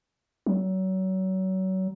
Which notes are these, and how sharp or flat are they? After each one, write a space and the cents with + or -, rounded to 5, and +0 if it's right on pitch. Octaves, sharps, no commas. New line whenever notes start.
F#3 +30